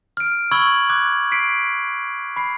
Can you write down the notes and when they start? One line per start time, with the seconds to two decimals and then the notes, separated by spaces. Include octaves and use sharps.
0.17 F6 D7
0.51 B5 C#6 E6 G#6 F#7 G7
0.89 D6 F#6 G#6
1.32 B6 C7 D7
2.36 B5 C7